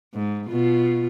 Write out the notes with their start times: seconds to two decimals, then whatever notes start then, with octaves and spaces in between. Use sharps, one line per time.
0.14 G#2
0.48 B2 F4